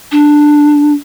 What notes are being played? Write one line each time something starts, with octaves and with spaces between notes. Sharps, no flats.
D4